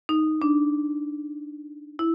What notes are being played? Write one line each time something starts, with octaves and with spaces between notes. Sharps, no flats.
D#4
D4
E4